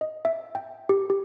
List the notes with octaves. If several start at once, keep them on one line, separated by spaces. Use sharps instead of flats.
D#5
E5
G5
G4
G4